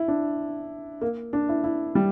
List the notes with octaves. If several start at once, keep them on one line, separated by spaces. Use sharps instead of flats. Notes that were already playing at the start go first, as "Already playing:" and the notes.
Already playing: E4
D4
A#3
D4
E4
E4
G3